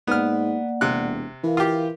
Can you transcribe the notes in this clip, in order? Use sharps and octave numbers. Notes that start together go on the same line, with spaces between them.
G#2 A#3 B3 D5 F#5 F6
E1 C3 F#6
E3 A#4 F5
F4 G4